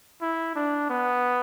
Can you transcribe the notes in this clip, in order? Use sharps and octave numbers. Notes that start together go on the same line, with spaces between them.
E4
D4
B3